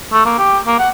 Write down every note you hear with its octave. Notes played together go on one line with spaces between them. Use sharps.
A3
A#3
G4
A#3
F#5